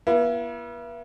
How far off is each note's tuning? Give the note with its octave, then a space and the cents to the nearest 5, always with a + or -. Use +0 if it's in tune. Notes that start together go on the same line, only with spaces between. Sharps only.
B3 -40 E4 +40